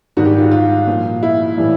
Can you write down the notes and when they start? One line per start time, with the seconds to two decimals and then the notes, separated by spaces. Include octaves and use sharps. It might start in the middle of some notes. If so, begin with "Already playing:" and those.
0.17 G#2 D#3 G3 F#4
0.26 G4
0.38 F4
0.42 F#4
0.51 F4
0.87 A#2 F3
1.23 E4
1.57 A2 E3 G3